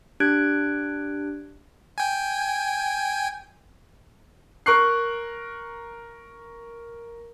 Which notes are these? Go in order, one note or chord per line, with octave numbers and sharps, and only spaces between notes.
D4 G4 F#6 G#6 D7
G5 G#5
A#4 C#6 F#6 C7